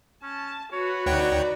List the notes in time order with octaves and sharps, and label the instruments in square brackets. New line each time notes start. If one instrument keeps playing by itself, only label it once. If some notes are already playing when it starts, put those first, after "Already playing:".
[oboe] C#4 [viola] A5
[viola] F#4 B4 [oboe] C#5
[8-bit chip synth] D2 C#5 G5 [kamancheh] D#4 D5 [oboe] F#5